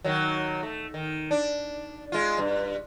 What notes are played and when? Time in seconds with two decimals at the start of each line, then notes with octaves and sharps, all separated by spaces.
0.04 D#3 F#3
0.63 A3
0.94 D#3
1.31 D4
2.12 G#3 F4
2.38 G2